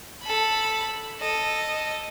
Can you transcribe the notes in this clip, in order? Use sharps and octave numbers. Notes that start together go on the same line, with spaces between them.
A4 B5
A4 D#5